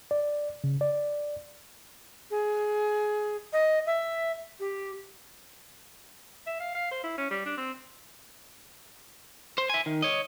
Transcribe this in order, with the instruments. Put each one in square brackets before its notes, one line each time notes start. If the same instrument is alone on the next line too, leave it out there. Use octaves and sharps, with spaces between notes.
[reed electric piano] D5
C#3
D5
[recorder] G#4
D#5
E5
G4
[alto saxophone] E5
F5
F5
C5
E4
C#4
G3
D4
C4
[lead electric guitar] C5
E5 G#5
D#3
C#5 D#5